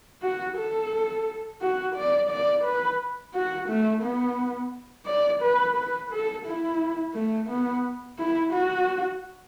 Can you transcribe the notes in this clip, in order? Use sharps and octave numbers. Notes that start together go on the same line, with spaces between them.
F#4
A4
F#4
D5
D5
B4
F#4
A3
B3
D5
B4
B4
A4
E4
A3
B3
E4
F#4